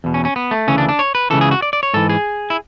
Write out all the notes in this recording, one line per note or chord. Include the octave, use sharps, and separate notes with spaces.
E2 B2
C#4
C#4
B3
A3
D2 C#3 E3 C#4
D4
D4
C#5
B4
C#2 C#3 E3 A4
G#4
F#4
D5
D5
C#5
G#2 E3 A4
G#4
E4